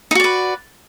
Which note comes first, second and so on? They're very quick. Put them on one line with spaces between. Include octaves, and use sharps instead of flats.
D#4 F#4 D5 B4